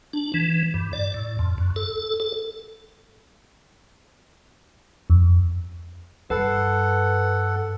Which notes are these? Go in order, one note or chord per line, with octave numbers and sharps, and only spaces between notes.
D4
E3
G2
D5
A2
F2
F#2
A4
A4
F2
G2 A4 B4 F#5